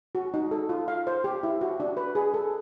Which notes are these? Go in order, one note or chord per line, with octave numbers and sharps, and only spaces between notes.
F#4
D#4
A4
F4
F5
C5
G4
E4
F#4
D4
B4
G#4
A4